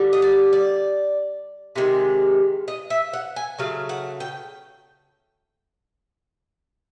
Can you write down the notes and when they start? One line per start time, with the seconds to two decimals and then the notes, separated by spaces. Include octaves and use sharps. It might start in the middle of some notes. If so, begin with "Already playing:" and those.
Already playing: D3 G3
0.13 D#5
0.22 D5
0.53 D5
1.76 C3 D#3 G#3
2.68 D#5
2.90 E5
3.13 F#5
3.36 G#5
3.59 C#3 F#3 A3 F5
3.89 F#5
4.20 G5